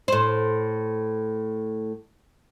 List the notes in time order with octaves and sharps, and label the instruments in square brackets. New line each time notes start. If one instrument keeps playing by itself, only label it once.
[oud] A2 C5